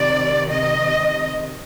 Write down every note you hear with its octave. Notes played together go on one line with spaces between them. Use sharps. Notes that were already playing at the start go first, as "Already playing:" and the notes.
Already playing: C3 D#3 D5
D#5